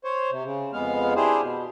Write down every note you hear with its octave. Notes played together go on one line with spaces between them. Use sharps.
C5 C#5
C3
C#3
F2 G#3 B3 F5
D4 E4 G4 G#4 C5
B2